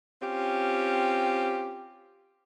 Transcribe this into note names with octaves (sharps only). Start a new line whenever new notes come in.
C4 C#4 F4 G4